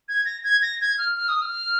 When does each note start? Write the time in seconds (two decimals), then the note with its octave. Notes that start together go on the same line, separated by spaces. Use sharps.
0.08 G#6
0.25 A#6
0.44 G#6
0.62 A#6
0.81 G#6
0.98 F6
1.17 F6
1.29 D#6
1.41 F6